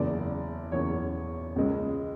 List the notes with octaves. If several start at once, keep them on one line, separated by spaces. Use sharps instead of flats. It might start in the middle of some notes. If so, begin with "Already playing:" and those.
Already playing: F#1 E2 C#3 D5
F#1 E2 C#3 C#5
C#2 C#3 G#3